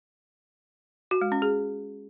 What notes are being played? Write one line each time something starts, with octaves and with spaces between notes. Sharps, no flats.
F#4
G#3
C#4
G#4